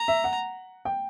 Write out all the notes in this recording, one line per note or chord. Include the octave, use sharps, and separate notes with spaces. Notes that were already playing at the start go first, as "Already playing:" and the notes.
Already playing: A#5
E5
F#5
G5